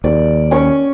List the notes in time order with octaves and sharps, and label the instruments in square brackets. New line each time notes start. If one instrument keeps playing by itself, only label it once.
[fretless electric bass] D#2 [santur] D5
[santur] C#4 C#6